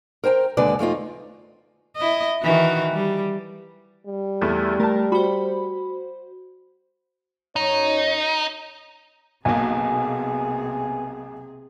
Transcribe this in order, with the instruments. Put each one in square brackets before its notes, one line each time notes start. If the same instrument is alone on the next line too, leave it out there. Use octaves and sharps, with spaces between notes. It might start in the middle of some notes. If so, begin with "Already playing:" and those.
[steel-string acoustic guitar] A#4 C5 G5 A5 A#5
D#2 D3 G#3 D4 B4 D5
F2 A3 D#4 F4
[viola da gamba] E4 D#5
D#3 E3 F#4
G3
[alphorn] G3
[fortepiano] E2 A3 E4
[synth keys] A3 [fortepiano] A#4 A5
[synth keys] F#4 C5 [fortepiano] B5
[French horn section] F#2 C#5 [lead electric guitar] D#4
[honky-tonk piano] B1 A#3 [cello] C3 G#4 [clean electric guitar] B3 F#4 A4 [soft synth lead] G#5